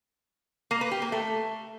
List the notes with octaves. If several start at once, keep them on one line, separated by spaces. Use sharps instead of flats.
A#3
B4
G4
A#3
A3